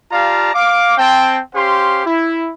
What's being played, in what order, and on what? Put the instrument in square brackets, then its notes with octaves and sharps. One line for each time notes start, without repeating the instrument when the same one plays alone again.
[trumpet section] F4 G4 D5 F5 A5 A#5
F5 D6
C4 G5 A5
C#4 G4 C5 F5 C6
E4